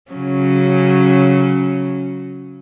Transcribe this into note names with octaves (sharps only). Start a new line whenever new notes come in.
C#3 F#3 C#4